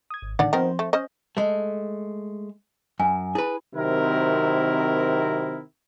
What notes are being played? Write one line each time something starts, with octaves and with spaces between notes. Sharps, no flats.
D#6 G#6
G#1
A2 D3 D#3 D4 D5 F#5
D#3 F3 B3 C4 A#4 C5
A3
C#4 C5 D#5
G#3 A3
F#2 G#5
E4 G#4 B4
C3 D#3 F#3 C4 E4 A#4